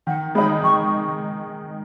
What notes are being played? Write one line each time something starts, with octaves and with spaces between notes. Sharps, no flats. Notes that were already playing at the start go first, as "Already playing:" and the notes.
D#3 F#5
G#3 D#4 B5
D#3 C#6